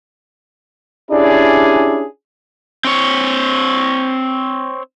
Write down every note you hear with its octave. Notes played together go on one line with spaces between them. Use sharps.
C#4 D4 E4 G4 G#4 D5
C4 C#5